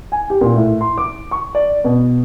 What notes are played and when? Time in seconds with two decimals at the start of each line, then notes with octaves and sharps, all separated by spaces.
0.12 G#5
0.30 G4
0.41 A#2
0.56 A2
0.81 C6
0.98 D6
1.31 C#6
1.55 D5
1.84 B2